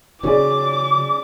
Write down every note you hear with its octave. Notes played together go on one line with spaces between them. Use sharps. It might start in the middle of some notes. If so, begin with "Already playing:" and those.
C#3 F#3 C#4 G#4 D5 D6